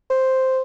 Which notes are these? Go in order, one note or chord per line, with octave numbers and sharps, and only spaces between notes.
C5